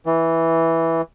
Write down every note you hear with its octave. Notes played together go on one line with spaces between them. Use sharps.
E3